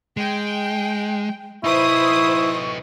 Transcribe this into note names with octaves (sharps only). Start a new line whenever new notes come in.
G#3 G5
D#4 E4 B4 C5 C#6 D#6